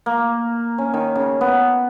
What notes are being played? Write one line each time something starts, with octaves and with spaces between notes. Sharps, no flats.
A#3
C#4
D#3
C#3
B3